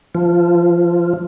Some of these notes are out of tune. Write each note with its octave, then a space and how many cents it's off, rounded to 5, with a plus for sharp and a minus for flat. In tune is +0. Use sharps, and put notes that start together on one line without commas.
F3 -15